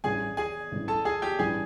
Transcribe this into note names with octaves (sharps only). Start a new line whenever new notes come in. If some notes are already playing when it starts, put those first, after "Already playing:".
A1 G2 E3 G#4 G#5
G#4 G#5
A1 G2 E3
A4 A5
G#4 G#5
G4 G5
A1 G2 E3 G#4 G#5